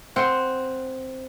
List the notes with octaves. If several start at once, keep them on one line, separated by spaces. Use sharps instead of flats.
C4 F#5